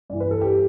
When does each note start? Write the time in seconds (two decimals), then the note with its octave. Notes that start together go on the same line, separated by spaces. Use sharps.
0.10 G2 E3 D5
0.20 B4
0.31 A4
0.41 G4